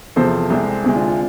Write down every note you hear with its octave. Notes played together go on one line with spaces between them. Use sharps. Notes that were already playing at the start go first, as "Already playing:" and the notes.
E2 C3 F3 A4 C5
C2 C3 G#3
D2 C3 G#3
D4 F4
D4 F4